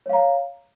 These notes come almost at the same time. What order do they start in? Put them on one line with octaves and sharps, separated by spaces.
C#5 F5 A#5